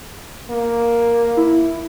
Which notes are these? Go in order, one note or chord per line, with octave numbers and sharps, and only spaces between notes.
A#3
E4